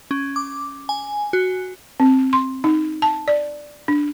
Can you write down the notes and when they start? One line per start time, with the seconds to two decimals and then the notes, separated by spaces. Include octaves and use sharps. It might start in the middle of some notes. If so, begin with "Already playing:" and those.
0.11 C#4
0.36 D6
0.89 G#5
1.33 F#4
2.00 C4
2.33 C6
2.64 D#4
3.02 A5
3.28 D5
3.88 D4